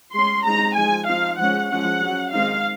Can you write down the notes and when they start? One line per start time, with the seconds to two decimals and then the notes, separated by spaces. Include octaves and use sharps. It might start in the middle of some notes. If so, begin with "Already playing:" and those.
0.13 G#3 C#4 C6
0.45 G#3 C4 D#4 A#5
0.75 F3 G#3 D#4 G#5
1.07 F3 C4 D#4 F5
1.39 F3 G#3 C#4 F#5
1.70 F3 G#3 C#4 F#5
2.01 F#3 C#4
2.32 D#3 G#3 C4 D#4 F5